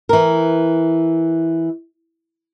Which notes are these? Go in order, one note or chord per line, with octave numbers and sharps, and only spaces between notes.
E3 A#4